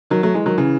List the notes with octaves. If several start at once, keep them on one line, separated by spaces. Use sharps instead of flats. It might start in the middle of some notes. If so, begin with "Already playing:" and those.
D#3 F#3
F#3 A3
E3 G#3
D#3 F#3
C#3 E3